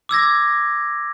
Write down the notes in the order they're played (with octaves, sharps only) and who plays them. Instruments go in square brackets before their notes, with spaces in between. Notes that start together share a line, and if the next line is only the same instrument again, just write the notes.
[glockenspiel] D6 E6 G#6 A#6